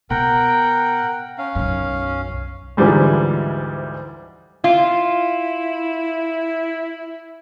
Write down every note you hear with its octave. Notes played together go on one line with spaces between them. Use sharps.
B2 A#4 F#5 G5
C#4 F5
B1 F#2
D2 G#2 E3 F3 G3 G#3
E4 F4